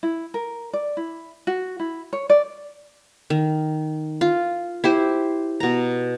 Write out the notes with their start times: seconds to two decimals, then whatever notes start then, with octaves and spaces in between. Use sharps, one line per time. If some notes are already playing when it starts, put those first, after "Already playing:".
0.03 E4
0.34 A#4
0.73 D5
0.97 E4
1.47 F#4
1.80 E4
2.13 C#5
2.30 D5
3.30 D#3
4.21 F4
4.84 E4 G4 C5
5.60 B2 A#5